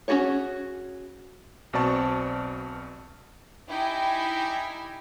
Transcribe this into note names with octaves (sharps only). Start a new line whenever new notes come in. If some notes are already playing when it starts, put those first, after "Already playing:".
C#4 E4 F#4 G#4 C#5
B1 B2 C4 D5 A5 C#6
D#4 E4 G4 E5 G5 G#5